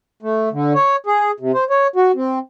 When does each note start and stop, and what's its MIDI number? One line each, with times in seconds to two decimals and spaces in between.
0.22 0.49 57
0.52 0.73 50
0.75 0.96 73
1.06 1.31 68
1.40 1.52 48
1.54 1.64 72
1.70 1.87 73
1.96 2.12 66
2.15 2.39 60